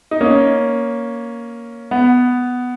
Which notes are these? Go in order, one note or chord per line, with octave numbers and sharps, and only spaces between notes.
D#4
A#3 C#4
B3